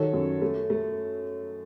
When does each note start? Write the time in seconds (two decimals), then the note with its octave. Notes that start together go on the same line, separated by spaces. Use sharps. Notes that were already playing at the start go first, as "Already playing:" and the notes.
Already playing: D#3 F#3 A4 C#5
0.13 F#2
0.42 A3
0.70 A3